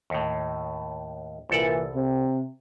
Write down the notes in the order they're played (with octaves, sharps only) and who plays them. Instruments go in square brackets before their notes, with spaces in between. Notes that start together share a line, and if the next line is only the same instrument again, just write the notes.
[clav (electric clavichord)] D#2 A2
[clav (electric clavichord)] C2 A4 D5 [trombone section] A#2 E3
[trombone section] C3